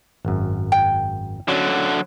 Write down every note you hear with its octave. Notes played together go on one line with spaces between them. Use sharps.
G#1 F#2
G5
D3 F#3 C#4 F#4 D5